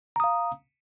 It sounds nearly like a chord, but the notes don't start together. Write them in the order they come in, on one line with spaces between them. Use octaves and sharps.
A#5 D#6 F5